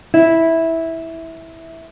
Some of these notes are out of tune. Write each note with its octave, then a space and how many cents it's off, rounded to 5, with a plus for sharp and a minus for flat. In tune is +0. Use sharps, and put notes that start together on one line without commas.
E4 -10